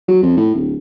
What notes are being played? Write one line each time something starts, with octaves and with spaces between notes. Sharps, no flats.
F#3
F2
A2
D1